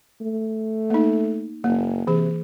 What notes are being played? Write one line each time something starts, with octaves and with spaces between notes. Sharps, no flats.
A3
A#3 D#4
F#1 A#3
C3 E3 G#4